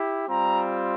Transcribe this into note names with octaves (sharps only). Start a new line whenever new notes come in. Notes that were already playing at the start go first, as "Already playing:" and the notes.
Already playing: E4 G4
G3 C4 F4 A#5